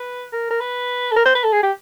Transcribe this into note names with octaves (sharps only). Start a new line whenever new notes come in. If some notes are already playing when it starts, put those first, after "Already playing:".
Already playing: B4
A#4
A#4
B4
A4
A#4
C5
B4
A4
G#4
G4